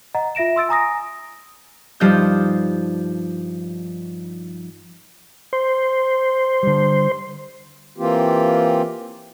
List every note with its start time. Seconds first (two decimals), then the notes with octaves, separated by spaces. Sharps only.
0.15 D#5 F#5 A#5
0.35 F4 E5 A#6 D7 E7
0.56 C6 E6 A6 D7
0.69 G#5 A#5 D#6 A#6
2.00 G2 F3 D#4 F6 G6
5.53 C5
6.63 D3 G3
7.98 E3 A#3 C4 F4 G4